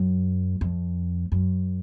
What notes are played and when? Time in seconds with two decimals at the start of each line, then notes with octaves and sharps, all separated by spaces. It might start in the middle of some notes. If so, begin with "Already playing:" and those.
Already playing: F#2
0.61 F2
1.32 F#2